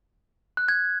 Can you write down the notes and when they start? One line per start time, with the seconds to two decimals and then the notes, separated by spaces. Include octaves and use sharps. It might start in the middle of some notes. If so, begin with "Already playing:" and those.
0.57 F#6
0.69 G#6